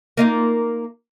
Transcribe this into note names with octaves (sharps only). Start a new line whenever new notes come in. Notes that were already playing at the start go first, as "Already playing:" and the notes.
A#3 D#4 F4